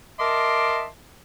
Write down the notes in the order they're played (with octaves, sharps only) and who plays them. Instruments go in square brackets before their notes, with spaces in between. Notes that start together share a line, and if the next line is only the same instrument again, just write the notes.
[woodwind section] A#4 D#5 E5 A5 C6 D6